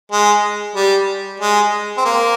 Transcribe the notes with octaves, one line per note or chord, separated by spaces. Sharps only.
G#3
G3
G#3
C4
A#3